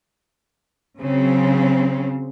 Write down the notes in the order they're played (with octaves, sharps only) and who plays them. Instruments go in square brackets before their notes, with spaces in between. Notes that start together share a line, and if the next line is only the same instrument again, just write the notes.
[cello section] C#3 F#3 C4